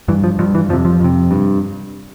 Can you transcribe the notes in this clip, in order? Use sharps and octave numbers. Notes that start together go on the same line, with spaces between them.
G2 E3
F3
G2 F3
E3
F2 C3 F3
F3
F2 C3
G2